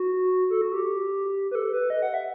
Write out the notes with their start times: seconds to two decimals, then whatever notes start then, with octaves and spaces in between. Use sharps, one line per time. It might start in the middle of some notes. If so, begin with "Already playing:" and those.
Already playing: F#4
0.50 A4
0.62 F#4
0.74 G4
1.51 B4
1.55 A4
1.73 B4
1.90 D#5
2.02 F#5
2.14 E5